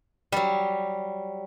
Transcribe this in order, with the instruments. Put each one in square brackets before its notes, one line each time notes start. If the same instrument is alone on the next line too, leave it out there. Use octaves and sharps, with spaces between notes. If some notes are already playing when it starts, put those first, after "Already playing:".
[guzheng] F#3 G3